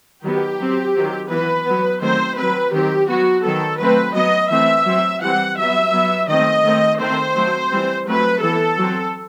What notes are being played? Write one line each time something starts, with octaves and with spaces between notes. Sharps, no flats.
D#3 F#3 B3 G4
F#3 C4
D#3 F#3 C4
E3 B3 B4
F#3 B3
D#3 F#3 A3 C4 C5
F#3 C4 B4
D#3 F#3 C4 G4
F#3 B3 F#4
D#3 F#3 B3 A4
F#3 A3 C4 B4
F#3 B3 D#5
E3 A3 C4 E5
F#3 C4
E3 G3 C4 F#5
F#3 B3 E5
F#3 B3
D#3 A3 C4 D#5
D#3 A3 C4
D#3 A3 C4 C5
F#3 A3 C4
E3 G3 C4
F#3 A3 C4 B4
E3 B3 A4
F#3 C4